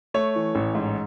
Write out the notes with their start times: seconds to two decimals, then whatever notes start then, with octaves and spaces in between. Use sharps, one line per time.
0.14 A3 C#5
0.36 E3
0.55 A1
0.75 G#2